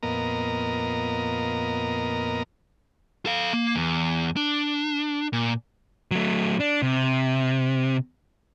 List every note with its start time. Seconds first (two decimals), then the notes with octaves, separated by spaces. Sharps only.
0.03 F2 A#2 B3 A#4 D#5 A#5
3.26 A4 F5
3.53 A#3
3.76 E2
4.36 D4
5.33 A#2
6.11 F#3 A3
6.60 D4
6.82 C3